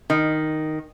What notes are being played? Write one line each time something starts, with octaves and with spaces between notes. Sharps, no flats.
D#3